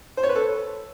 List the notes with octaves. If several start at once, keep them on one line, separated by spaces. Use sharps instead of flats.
C5
C#5
B4
A4